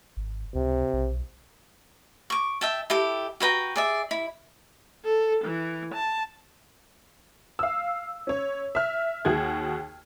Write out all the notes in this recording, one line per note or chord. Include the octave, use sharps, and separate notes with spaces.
G#1
C#2 C3
B1
C#6 D6
E5 G5 A5
E4 G4 A4
F#4 B4 G5 A#5
G#4 D5 E5
E4 B5
A4
E3
A5
F5 E6
C#4 C#5
E5 F6
D#2 F#4 G#4 G#6